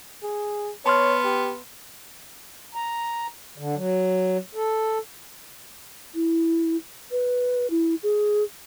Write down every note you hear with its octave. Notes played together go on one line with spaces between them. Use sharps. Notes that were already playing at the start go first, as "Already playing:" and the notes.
G#4
B3 C#5 A5 C6 F6
G4
A#5
D3
F#3
A4
E4
B4
E4
G#4